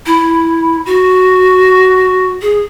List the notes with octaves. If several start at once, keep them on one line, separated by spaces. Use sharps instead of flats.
E4
F#4
G#4